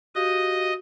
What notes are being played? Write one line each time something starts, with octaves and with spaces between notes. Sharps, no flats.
F#4 G4 D#5 F5